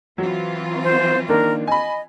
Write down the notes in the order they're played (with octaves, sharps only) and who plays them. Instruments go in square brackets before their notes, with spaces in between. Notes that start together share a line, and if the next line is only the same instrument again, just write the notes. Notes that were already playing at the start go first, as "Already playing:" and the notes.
[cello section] E3 C4 F4 [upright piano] F#3
[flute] C5
[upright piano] D#3 A#3 D4 [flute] A#4
[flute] D#5 [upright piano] G#5 B5